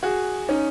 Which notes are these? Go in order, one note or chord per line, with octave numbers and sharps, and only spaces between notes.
F#4 G#4
C#4 D#4